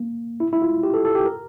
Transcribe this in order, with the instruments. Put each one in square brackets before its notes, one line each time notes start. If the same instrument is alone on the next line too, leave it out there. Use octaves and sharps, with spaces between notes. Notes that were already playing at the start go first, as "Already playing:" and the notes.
Already playing: [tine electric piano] A#3
E4
E4
F4
G4
A4
A4
G4
A#4